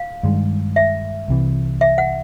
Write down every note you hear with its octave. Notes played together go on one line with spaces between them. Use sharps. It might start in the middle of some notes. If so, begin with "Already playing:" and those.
Already playing: F5
G2 D#3 G#3
E5
C2 C3 E3
E5
F#5